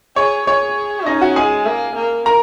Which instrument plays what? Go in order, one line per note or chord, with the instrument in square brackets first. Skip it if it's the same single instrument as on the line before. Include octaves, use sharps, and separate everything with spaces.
[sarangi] G#4 [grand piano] C#5
[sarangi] G#4 [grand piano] C#5
[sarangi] C#4 [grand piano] D#4 D#5
[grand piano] F#4 F#5
[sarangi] G#3 [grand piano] G#4 G#5
[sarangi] A#3
A#3
[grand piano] A#4 A#5